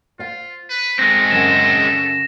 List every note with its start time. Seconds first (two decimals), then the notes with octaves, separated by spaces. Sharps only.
0.19 F4 C5 F5
0.69 B4
0.99 G#3 A3 C4 A#6
1.31 F#2 C#3 F#5 E7